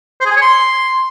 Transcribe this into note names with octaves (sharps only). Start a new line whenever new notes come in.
C5
G#4
G#5
C#5
C6